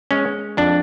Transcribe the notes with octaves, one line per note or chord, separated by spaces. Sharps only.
G#3 C#4
F2 D4